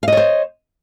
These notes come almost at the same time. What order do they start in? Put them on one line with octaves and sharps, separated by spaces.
F5 D#5 C#5 C5